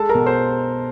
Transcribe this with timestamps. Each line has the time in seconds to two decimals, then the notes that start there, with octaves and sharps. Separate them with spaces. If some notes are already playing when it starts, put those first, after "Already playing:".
Already playing: G#3 A4 A5
0.09 A#4 A#5
0.15 B2
0.26 C5 C6